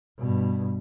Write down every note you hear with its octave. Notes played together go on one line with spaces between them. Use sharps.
G2 B2